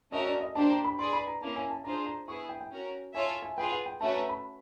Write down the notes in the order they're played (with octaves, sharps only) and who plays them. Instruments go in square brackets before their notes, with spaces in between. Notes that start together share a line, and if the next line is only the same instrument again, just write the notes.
[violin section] A3 C#4 F#4 A#4 C#5 [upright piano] D#5
[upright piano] D5
D#5
[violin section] A#3 D4 G4 C5 [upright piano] A5
[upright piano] A#5
B5
[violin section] G#4 B4 D5 [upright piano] C6
[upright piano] B5
A#5
[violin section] A#3 C#4 E4 [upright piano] A5
[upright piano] G#5
A5
[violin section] D4 F4 G#4 C5 [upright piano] A#5
[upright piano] A#5
[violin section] B3 E4 G#4 [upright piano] C#6
[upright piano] G5
G5
[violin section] C#4 F#4 A#4
[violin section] F4 A4 C#5 E5 [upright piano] G#5
[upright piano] G#5
G#5
[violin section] F4 G#4 B4 [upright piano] G5
[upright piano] F#5
G5
[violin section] A3 C#4 F#4 B4 [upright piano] A5
[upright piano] A#5
B5